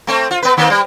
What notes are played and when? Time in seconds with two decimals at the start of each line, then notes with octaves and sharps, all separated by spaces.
0.07 A3 C4
0.31 F4
0.42 B3 B4
0.57 D#3 A#3 C4
0.70 G3